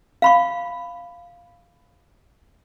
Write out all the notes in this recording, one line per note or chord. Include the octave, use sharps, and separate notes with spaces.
F5 B5 C#6